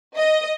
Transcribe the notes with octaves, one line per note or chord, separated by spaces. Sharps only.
D#5